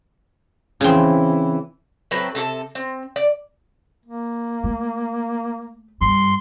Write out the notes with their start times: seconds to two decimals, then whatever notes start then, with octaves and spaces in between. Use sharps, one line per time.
0.81 C#3 E3 C4
2.11 A2 F#3 C4 B4
2.35 C3 A4 A#4 A5
2.75 C4
3.16 D5
4.05 A#3
4.64 A3
6.01 G2 C6